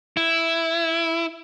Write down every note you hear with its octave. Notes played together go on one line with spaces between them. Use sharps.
E4